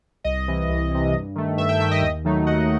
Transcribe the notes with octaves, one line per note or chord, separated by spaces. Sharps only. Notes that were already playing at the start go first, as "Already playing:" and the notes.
C2 D#5
C3 E3
C2
C3 E3
G2
D#3 A3
G2 E5
E5 G5
D#3 A3 E5
D#5
D#2
D#3 F#3 A3 D#4
D#2 D#5 F#5